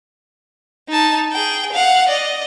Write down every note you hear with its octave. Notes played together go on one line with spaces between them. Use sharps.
D#4 A5
G#4 G5
F5 F#5
D5 D#5